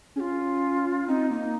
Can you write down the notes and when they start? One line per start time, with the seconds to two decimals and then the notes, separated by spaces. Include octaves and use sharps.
0.16 C#4 G#4
0.20 F4
1.08 C4 D#4
1.31 A#3 D#4